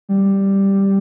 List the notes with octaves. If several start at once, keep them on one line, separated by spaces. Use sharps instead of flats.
G3